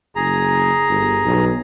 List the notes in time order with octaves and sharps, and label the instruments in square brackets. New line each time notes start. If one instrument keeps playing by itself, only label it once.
[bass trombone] F#1 [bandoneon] G#4 A#5
[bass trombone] G1
B1